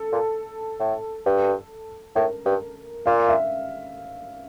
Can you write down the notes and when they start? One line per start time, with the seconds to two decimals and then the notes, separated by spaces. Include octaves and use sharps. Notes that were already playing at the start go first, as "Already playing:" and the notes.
Already playing: A4
0.12 A#2
0.80 A2
1.26 G2
2.15 A2 A#4
2.46 G2
3.06 A#2 F5
3.29 E5